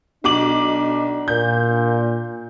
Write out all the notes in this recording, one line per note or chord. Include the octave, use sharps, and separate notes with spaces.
B1 D4 D6 F#7
A#2 G6